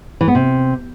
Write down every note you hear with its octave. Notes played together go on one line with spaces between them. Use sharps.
E3
B3
C3